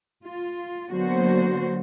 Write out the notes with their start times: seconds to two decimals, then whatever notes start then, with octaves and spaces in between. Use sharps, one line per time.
0.23 F4
0.90 D3 F#3 A#3 B3 F#4 C5